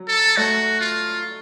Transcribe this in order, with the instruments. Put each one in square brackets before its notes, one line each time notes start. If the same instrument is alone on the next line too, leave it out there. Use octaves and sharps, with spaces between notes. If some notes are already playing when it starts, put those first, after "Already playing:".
Already playing: [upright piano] F#3
[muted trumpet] A4
[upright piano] A3 [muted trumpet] F#4
[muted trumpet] F4